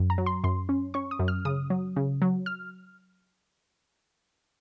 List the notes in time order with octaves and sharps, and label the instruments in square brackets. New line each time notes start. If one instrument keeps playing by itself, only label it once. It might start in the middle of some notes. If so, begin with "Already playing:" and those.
Already playing: [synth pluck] F#2
A#5
F#3
C6
F#2 C6
C#4
C#4 C#6
D#6
F#2
F6
C#3 D#6
F#3
C#3
F#3
F6